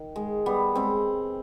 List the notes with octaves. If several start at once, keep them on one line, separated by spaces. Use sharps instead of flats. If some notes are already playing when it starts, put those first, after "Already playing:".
Already playing: D#3
G#3
G3 B3
G#3 C4